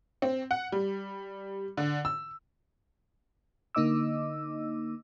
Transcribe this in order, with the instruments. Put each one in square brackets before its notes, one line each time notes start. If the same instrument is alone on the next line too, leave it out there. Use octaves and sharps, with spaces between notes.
[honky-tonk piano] C4
F#5
G3
D3
E6
[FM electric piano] D3 A#3 D#4 D#5 D6 E6